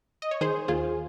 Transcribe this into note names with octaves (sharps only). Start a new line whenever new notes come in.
D#5
C#5
D#3 G#4 C5
D#2 F4 G#4